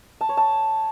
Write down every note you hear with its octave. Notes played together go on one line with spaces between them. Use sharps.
A5
C#5
A5